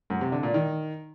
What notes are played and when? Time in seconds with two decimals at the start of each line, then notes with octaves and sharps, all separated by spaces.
0.10 F#2
0.21 C3
0.32 D3
0.43 A#2
0.54 D#3